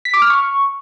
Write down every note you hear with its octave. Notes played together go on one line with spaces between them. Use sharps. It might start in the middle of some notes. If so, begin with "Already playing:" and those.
B6
D6
F6
C#6